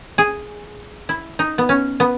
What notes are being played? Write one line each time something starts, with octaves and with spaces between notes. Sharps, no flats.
G#4
E4
D#4
B3
C#4
B3